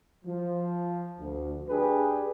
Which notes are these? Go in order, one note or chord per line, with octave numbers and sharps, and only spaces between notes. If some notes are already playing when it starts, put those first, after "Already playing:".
F3
D2
D4 G4 G#4 B4